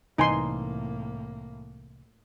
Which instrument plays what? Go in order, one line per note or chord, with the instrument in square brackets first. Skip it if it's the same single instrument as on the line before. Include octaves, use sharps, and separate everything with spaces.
[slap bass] C2 E3 [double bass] A2 A#3 [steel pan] D#4 G#5 C6